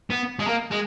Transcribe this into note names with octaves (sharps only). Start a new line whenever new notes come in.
B3
G#3
A#3
G#3